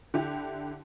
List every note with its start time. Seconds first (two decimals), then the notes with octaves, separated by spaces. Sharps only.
0.14 D3 E4 G4